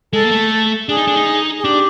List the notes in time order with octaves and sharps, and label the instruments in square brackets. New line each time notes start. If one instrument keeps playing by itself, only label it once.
[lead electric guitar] G#3 [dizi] A4
[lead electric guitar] A#3
A3
[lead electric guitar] D4 [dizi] G#4
[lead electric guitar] D#4
D4
D#4
[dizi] G#4
[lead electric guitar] D4 [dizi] G4